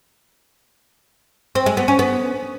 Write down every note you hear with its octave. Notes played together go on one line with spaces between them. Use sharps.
C4
G#3
B3
C#4
B3